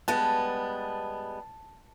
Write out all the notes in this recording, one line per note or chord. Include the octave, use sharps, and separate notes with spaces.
G3 G#3 B3 A5